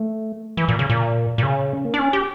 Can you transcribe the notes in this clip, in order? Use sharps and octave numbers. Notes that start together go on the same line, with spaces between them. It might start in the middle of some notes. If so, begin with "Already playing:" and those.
Already playing: A3
E3
A#2
C#3
A#2
A#2
C#3
C#4
A#3
D4
C#4
G4